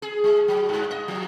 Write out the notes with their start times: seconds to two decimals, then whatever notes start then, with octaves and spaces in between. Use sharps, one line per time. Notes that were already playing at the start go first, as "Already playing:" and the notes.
0.02 G#4
0.24 G#3
0.48 F#3
0.69 G2
0.91 D#5
1.08 F3